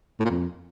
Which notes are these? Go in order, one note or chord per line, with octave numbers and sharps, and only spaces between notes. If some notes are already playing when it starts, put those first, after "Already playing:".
A2
A#2
F2